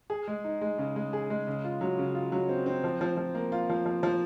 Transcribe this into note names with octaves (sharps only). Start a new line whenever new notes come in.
G#4
G#3
D#4
G#3
C#3
G#3
G#4
G#3
C#3
F4
F#3
C#3
F4
F#3
C4
C4
F3
F3
F3
A#3
F4
F3
F3
F3